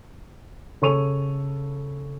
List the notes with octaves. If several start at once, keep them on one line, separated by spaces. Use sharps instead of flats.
C#3 A4 C#5 C#6 D#7 F7